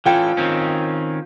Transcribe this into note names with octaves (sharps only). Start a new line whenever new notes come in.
E3 C#4 F4 A4 G5
D#3 C4 C#4